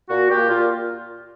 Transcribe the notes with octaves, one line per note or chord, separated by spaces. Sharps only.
A#2 F#4
A#2 G4
A#2 F4